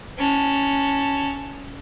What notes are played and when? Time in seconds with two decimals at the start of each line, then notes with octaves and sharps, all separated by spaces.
0.18 C#4 A5